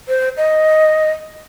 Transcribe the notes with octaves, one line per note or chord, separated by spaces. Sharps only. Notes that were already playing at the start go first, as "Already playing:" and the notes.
C5
D#5